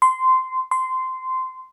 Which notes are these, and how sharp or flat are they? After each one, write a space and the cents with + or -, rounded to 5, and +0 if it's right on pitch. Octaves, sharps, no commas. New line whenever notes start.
C6 -15
C6 -15